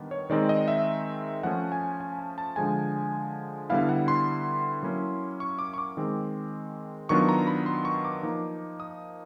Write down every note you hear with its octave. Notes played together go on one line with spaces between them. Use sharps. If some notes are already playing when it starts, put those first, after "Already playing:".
Already playing: D#3 G3 B3 D4
C#5
D#3 G#3 C4 D#4 D5
D#5
E5
F3 A3 C#4 F#5
G#5
G#5
A5
A5
D3 F3 G#3 G#5
D3 G3 B3 E4 F5
F#5
C6
F#3 A#3 C#4 E4
C#6
D6
C#6
D6
D#3 G#3 C4
D#3 F#3 B3 D4 F4 C#6
A#5
B5
C6
C#6
D6
F3 A#3 D#4
D#6